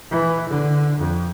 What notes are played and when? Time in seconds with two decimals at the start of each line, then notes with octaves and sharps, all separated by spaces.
0.11 E3
0.49 D3
0.98 F2